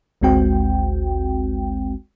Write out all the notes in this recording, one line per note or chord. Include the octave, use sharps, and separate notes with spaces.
G#1 D2 G#3 C4 F#4 G5